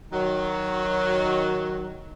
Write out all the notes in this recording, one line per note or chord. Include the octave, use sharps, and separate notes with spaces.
D#3 F#3